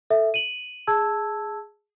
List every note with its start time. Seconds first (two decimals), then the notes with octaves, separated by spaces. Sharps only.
0.10 A4 E5
0.34 D#7 F#7
0.87 G#4 A5 E6 G#6